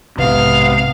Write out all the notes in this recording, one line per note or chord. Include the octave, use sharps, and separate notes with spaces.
B1 G#2 C3 B3 F5